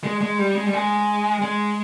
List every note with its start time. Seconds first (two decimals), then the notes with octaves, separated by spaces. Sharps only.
0.04 G#3
0.21 G#3
0.38 G3
0.55 G#3
0.66 G3
0.73 G#3
1.42 G#3